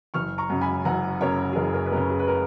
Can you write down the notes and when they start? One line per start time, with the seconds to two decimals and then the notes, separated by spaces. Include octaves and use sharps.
0.14 F#1 C#6 F6
0.38 A#5 C#6
0.50 F#2 C#3
0.61 G#5 B5
0.85 F#1 F#5 A#5
1.21 F#2 C#3 A#4 C#5
1.53 G#4
1.56 F#1 A#4
1.74 A#4
1.86 B4
1.92 F#2 A#4
1.96 C#3
2.10 G#4
2.19 B4
2.28 A#4